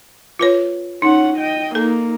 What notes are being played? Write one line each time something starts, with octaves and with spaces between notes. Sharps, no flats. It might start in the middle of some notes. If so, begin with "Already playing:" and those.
F4 B4 C#5
C#4 D#4 F#5
D#5 G5
A#3 D#4 A4